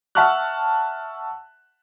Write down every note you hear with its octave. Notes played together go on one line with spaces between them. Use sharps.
E5 F#5 A5 C#6 F6 F#6